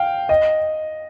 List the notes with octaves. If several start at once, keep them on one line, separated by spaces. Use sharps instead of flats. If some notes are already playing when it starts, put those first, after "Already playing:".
Already playing: F5 G5
D#5